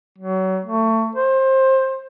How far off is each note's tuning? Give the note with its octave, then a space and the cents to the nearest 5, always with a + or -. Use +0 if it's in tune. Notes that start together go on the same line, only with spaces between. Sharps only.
F#3 +30
A3 +25
C5 +20